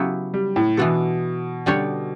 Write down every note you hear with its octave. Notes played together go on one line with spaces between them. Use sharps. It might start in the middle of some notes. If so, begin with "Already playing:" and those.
Already playing: C#3 F#3 B3 E4 G4
G3
A2
B2 E3 B3 D4 A4
D3 G3 D4 G4 C#5